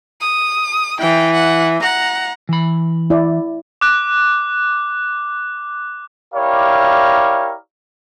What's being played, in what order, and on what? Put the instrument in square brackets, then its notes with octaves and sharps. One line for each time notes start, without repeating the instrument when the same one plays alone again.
[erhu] D#6
[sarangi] E3 [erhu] G5
[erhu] F#5
[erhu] F#5 [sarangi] A#5
[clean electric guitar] E3 B5
[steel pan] E4 D5
[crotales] D6 F#6
[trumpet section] E4 G4 A#4 C#5 D5 F5